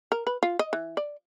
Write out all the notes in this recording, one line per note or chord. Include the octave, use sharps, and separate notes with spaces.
A#4
B4
F4
D#5
E3
D5